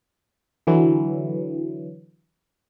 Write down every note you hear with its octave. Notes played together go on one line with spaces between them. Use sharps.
D3 E3 F#3